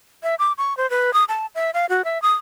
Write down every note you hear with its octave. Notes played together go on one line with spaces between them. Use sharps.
E5
D6
C#6
C5
B4
D#6
A5
E5
F5
F#4
E5
D#6